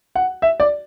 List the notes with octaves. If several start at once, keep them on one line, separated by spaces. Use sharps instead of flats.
F#5
E5
D5